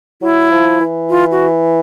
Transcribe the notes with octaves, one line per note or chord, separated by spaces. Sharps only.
F#3 E4
F3
E3
F4
F#4